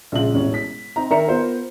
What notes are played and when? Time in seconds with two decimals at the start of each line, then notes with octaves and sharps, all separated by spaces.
0.12 A#1 C#3 G#3 F4 F#7
0.33 E1 A1 C#4
0.54 B6
0.96 C4 D#4 A#5
1.10 D#3 A#4 D5 E5 A#5 C#7
1.28 B3 F4 A#4 C5